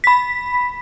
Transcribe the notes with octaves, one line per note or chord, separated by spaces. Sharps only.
B5 B6